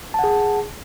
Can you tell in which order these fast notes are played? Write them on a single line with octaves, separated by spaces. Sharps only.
A5 F#5 G#4